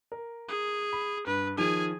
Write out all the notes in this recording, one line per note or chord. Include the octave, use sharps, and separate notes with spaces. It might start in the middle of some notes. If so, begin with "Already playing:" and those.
A#4
G#4
B5
G2 B4
D#3 F3 G#4 G#5